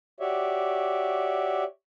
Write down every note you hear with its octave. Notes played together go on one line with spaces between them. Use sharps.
F#4 G4 C#5 D5 E5